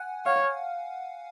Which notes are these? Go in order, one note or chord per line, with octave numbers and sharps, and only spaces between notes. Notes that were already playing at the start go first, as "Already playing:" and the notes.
Already playing: F#5 G#5
C#5 F5